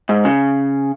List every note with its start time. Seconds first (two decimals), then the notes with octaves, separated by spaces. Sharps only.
0.09 G#2
0.25 C#3